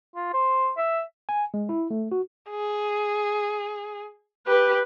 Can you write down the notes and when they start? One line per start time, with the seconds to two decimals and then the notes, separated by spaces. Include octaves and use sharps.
0.15 F4
0.33 C5
0.77 E5
1.29 G#5
1.54 G#3
1.69 E4
1.91 A3
2.12 F#4
2.50 G#4
4.47 G4 B4